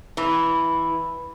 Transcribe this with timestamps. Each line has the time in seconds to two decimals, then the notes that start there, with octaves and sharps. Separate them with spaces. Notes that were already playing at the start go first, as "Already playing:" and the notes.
0.17 E3